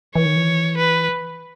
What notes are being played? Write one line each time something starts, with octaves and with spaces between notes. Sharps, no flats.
E3 C#5
D#3
E3
B4